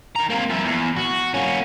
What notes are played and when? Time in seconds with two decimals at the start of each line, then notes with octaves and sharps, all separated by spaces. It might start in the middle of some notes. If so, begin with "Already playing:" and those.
0.16 D#3 A#5
0.30 A#3 C4
0.50 F3 E4
0.64 E2
0.97 F#4
1.34 A#3 C#4